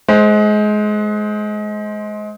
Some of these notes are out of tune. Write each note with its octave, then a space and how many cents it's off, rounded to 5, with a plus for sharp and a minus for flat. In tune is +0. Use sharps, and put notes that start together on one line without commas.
G#3 +25 C5 +0